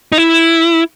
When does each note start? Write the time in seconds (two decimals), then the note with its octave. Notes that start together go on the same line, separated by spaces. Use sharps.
0.12 D#4
0.18 E4